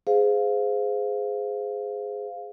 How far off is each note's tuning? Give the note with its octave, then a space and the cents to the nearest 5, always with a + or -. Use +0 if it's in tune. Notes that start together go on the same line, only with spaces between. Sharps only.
G#4 +0 C5 -25 F5 +0